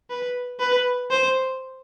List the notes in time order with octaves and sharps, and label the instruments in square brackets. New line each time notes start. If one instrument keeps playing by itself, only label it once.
[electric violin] B4
B4
C5